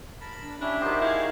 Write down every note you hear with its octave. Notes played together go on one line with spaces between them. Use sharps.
A#4 A5 B5
D4
C#4 D4 E4 G4 E5
D#3 F#4 G4 C5 D#5
E4 G#4 C#5 F5